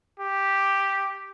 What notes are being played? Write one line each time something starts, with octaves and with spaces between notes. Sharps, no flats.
G4